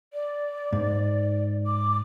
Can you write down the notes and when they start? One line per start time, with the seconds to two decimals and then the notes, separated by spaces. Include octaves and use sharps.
0.13 D5
0.73 G#2
1.66 D6